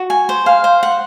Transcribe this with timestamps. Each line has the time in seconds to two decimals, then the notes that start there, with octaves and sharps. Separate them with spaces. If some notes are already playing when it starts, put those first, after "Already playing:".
Already playing: F#4
0.10 G#5
0.29 C5
0.46 F5
0.64 C5
0.83 F#5